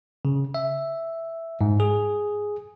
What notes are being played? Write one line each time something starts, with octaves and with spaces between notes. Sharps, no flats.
C#3
E5
G#2
G#4